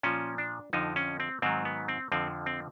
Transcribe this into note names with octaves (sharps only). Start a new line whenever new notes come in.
A#2 F3 C#4
D4
F2 D3 F3 D#4
C#4
C4
G#2 D#3 F#3 C4
B3
C4
F2 D3 F3 C4
C4